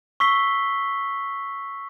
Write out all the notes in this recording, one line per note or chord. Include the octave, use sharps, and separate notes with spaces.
C#6 E6 B6 C7 G7